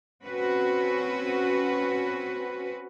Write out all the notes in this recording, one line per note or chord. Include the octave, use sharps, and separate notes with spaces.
C4 C#4 F#4 B4